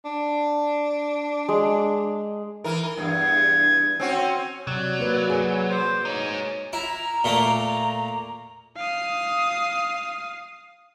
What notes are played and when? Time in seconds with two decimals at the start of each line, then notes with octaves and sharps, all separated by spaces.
0.05 D4
1.49 G#3
2.64 E3 A#4
2.98 E2 G2 G#6
4.00 C4 C#4 F#4
4.67 C3 F#3 D5
4.99 A#3 F#4 B4
5.30 G#4 B4
5.70 C5 D6
6.05 G#3 D#4 C#5
6.73 E4 A#5
7.24 A#2 A3 A#3
8.76 F5 D#6